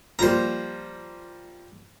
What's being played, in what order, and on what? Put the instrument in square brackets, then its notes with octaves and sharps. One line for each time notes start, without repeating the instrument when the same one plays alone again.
[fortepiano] F3 G3 A#3 [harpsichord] C5 A#5